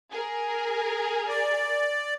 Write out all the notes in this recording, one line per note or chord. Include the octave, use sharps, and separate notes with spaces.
G#4 A#4
D5